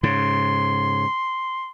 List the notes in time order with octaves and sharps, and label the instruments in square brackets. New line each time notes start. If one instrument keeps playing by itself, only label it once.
[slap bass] G#2 C#3 [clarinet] C6